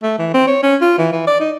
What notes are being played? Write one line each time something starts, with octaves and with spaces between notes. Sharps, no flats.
A3
E3
C4
C#5
C#4
F4
E3
E3
D5
D#4